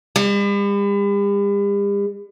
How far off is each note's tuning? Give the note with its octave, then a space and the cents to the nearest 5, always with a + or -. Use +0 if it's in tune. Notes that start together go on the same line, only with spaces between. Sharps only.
G3 +45